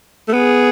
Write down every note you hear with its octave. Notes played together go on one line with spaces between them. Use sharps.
A3
B3 G#4